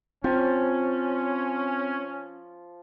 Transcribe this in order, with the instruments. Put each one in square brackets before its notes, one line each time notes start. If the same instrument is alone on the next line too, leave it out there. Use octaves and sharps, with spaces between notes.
[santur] F3 [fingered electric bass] C4 [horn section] C#4